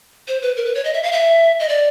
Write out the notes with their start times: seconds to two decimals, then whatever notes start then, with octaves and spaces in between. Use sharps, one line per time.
0.28 C5
0.42 B4
0.57 A#4
0.66 B4
0.75 C#5
0.85 D#5
0.94 E5
1.03 F5
1.12 E5
1.60 D#5
1.69 D5